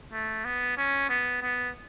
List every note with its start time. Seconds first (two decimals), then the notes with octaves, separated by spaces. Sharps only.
0.12 A3
0.45 B3
0.77 C#4
1.09 B3
1.42 B3